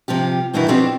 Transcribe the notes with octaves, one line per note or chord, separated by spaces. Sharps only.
C3 F3 F4 G4
G2 B2 D#3 E3 D#4 E4
B2 F3 B3 C4 D4 G4